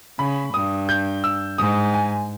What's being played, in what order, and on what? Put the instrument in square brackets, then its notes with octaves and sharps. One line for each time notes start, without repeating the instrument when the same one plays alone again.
[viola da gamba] C#3 [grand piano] B5
[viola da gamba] G2 [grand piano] D#6
[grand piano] G6
E6
[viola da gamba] G#2 [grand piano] D#6
[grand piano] G#5